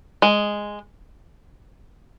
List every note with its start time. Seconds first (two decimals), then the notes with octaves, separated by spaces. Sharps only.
0.22 G#3